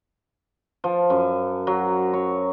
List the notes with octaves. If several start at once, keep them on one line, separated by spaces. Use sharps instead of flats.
F3
F#2
F#3
C#5